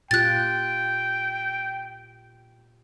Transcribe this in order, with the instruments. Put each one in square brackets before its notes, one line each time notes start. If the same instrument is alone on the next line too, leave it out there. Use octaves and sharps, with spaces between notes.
[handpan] A#2 F4 G4 [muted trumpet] G5 [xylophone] F#6 A6